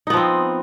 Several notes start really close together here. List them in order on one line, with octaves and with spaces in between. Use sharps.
D#4 B3 F3 C4